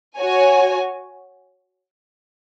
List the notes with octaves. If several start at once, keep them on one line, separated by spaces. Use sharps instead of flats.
F#4 C#5 G#5